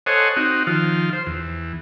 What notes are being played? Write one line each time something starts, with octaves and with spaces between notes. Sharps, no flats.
A4 C5 C#5 D#5 F#5 G#5
C4 D#4 F#4
D#3 F3 F4
C5
E2